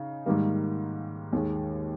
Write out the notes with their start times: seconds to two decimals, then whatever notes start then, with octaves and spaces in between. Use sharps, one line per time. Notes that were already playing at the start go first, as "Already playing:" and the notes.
Already playing: C#3 D#4
0.26 G#2 D#3 G3 A#3
1.33 D#2 D#3 G#3